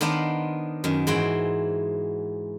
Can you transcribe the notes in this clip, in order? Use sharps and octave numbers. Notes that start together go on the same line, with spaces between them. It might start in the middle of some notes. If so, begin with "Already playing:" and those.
D#3 B3 D4 C5 F5 A#5
F#2 D#3
G#2 E3 F#4 C5 G5